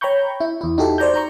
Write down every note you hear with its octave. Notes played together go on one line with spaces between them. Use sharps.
C#5 G5 A#5 B5 C#6 G6
E4
E2 E4
D#4 F#4 G4 A4 E5
C5 D5 A#5 G6
D#4 A#5 C#6